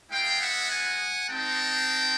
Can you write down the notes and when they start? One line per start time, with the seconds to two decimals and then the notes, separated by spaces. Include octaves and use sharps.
0.12 G#3 B3 E4 F5 G5
0.41 E5 F#5
0.70 F#5 G#5
1.29 G#3 C4 D#4 G5 A5